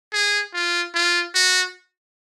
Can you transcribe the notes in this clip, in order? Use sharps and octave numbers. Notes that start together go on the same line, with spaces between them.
G#4
F4
F4
F#4